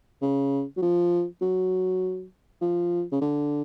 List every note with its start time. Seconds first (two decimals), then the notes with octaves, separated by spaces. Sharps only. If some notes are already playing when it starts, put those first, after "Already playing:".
0.21 C#3
0.77 F#3
0.82 F3
1.42 F#3
2.62 F3
3.12 C#3
3.21 D3